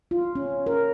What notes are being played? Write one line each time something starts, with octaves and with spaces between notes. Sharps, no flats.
F4
C#4
A#4